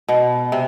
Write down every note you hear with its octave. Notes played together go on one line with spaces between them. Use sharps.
B2
C3